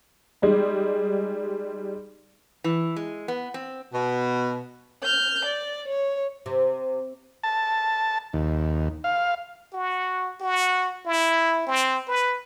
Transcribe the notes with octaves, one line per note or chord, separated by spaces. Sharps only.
G3 G#3 D#4
E3
G#3
B3
C4
B2
F6 G6
D5
C#5
C3
A5
D#2
F5
F#4
F#4
E4
C4
B4